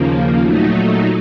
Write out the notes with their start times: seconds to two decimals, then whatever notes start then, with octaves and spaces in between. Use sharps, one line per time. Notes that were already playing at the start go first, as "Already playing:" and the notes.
Already playing: D#2 C#3 F3 A#3
0.39 A#2 F#3 A3 D#4